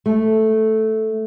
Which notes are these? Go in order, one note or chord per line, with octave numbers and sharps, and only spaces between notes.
A3